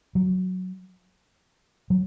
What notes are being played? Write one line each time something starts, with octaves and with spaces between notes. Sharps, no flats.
F#3
F#3